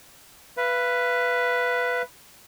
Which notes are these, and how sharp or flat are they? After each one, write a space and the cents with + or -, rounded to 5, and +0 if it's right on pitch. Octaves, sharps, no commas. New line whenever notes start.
B4 +0 F5 -35